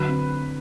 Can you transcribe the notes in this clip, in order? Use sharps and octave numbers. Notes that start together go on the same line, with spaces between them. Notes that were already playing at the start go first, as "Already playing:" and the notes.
Already playing: D3 F#3 B4
C4